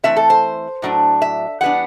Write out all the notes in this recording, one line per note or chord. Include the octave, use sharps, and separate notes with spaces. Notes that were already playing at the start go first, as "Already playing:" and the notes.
E3 A3 C4 E5
A4
C5
A2 F#3 A3 D4
E5
E3 G3 B3 D4 F#5